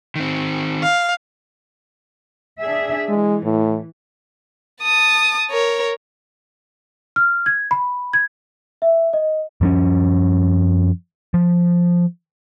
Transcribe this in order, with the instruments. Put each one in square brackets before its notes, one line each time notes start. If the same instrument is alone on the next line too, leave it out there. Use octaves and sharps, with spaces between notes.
[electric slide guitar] D#3 C4
[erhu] F5
[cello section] D4 G#4 E5
[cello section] E3 [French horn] G#3
[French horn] A2
[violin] A5 D#6
A#4 C#5
[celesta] F6
G#6
B5
G#6
E5
D#5
[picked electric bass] F#2 F3 C#4
F3